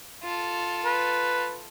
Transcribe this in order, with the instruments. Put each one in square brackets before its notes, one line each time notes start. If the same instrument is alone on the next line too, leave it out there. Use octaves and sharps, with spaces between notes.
[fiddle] F4 A4
[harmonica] B4